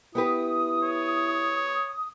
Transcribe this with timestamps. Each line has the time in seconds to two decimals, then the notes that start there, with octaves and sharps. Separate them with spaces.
0.15 B3 E4 G4 B4 D#6
0.84 C#5